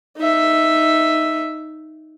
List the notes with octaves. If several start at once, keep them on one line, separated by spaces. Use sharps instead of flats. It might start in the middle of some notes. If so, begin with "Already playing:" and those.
D#4 E5